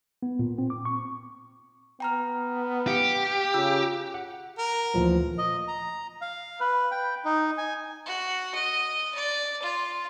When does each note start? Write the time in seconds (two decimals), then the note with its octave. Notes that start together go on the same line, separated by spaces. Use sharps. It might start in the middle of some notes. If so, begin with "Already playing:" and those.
0.23 B3
0.39 A#2
0.58 C4
0.70 D6
0.85 C#6
2.00 B3 G5 A#5 F6
2.87 G4 F5 C#7
3.54 C#3 F4 E6
4.14 F#5
4.58 A#4
4.94 D2 A#2 E3 F3
5.38 D#5
5.68 A#5
6.21 F5
6.60 B4
6.91 G5
7.25 D#4
7.58 G#5
8.06 F#4
8.55 D#5
9.15 D5
9.62 F4